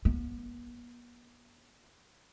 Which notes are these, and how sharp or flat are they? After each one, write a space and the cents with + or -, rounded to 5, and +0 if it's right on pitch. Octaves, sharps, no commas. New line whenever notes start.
B3 -40